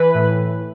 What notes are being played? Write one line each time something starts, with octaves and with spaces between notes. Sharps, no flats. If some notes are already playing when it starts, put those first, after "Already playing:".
Already playing: E3 B4
A2